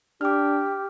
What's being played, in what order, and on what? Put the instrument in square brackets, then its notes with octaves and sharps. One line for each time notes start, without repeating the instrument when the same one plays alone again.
[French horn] D4 [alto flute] G4 [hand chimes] D6 F6